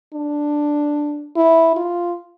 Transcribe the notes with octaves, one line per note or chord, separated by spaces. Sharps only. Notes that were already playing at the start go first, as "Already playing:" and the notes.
D4
E4
F4